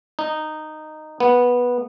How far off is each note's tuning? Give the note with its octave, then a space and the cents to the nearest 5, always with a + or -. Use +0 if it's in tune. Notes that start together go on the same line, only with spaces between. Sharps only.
D#4 -10
B3 -10